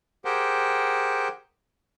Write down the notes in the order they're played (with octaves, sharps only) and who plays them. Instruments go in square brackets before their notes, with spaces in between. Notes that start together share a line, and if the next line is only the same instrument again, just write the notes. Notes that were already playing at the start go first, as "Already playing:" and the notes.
[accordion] G4 G#4 A#4 C5 F#5 G5